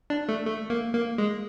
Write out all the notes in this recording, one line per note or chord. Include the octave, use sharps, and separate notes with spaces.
D4
A3
A3
A#3
A#3
G#3